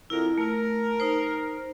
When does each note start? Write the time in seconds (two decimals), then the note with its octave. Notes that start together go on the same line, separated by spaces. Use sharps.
0.10 F2 E4 A#4
0.38 A3 A#4
1.00 D#4 C5